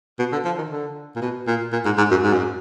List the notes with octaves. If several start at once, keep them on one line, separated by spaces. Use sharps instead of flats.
B2
D3
F3
D#3
D3
A#2
B2
A#2
A#2
G#2
G#2
F#2
G#2
F#2